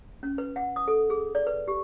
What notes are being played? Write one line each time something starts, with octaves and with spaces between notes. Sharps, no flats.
C#4
B4
F#5
D#6
A4
G#4
D5
B4
G4